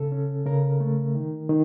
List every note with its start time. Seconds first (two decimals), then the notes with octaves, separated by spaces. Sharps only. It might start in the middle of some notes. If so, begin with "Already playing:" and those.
Already playing: C#3 A4
0.12 C#4
0.46 C#3 A#4
0.80 A3
1.15 D#3
1.49 D#3